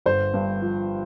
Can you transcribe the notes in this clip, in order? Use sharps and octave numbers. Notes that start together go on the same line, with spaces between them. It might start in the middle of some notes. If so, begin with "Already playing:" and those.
G1 C5
G2
F3